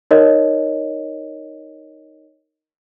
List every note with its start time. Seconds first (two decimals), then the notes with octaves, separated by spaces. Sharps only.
0.11 D#4 A#4 C#5 D#5